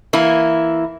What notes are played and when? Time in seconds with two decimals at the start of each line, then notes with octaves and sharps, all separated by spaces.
0.13 E3 A#3 E4